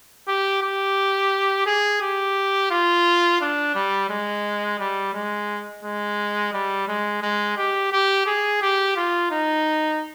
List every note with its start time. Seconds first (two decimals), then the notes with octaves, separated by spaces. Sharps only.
0.28 G4
0.63 G4
1.67 G#4
2.02 G4
2.71 F4
3.41 D4
3.75 G3
4.10 G#3
4.79 G3
5.14 G#3
5.84 G#3
6.54 G3
6.88 G#3
7.23 G#3
7.57 G4
7.92 G4
8.27 G#4
8.62 G4
8.96 F4
9.31 D#4